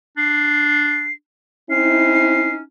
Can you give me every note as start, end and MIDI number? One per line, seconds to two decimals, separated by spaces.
0.17 1.13 62
0.17 1.12 96
1.70 2.59 60
1.70 2.63 61
1.70 2.59 63
1.70 2.59 64
1.70 2.51 96